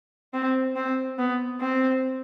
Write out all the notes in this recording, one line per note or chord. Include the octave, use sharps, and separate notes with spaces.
C4
C4
B3
C4